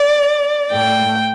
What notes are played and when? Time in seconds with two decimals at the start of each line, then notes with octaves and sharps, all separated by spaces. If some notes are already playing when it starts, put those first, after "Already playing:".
Already playing: D5
0.71 A2 A3 G5